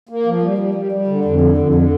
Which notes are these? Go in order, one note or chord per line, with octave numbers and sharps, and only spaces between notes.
A#3
F3
G3
G3
G3
G3
D3
F2
D3
F2
D3